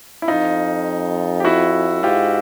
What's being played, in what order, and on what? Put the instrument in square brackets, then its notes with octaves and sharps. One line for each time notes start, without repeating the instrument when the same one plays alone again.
[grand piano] E4
[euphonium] F2 [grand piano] D#4 F4
[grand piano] G4
E4 F#4
[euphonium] G#2 [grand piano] F4 G4